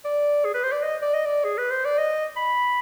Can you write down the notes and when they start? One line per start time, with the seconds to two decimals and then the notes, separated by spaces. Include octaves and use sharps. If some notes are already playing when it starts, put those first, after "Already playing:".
0.05 D5
0.45 G#4
0.55 B4
0.63 C5
0.72 D5
0.83 D#5
1.02 D5
1.14 D#5
1.26 D5
1.44 G#4
1.58 B4
1.71 C5
1.85 D5
1.98 D#5
2.37 B5